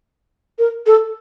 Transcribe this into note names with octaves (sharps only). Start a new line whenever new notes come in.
A#4
A4